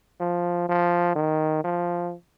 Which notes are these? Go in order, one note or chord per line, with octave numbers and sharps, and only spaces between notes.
F3
F3
D#3
F3